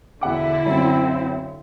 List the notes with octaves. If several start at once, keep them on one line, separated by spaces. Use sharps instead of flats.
E1 D3 E4 F#5 D6
B1 F#2 C4